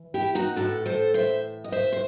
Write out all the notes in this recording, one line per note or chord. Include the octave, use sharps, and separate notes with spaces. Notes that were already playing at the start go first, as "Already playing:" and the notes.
Already playing: E3
E4 G4
D#4 F#4
A2 E3 F#4 A4
A4 C5
C5 E5
D#5
C5 E5
C5